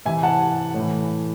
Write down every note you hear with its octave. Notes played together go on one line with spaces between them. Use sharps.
C3 E3 E5 G#5
F#5 A5
A2
E3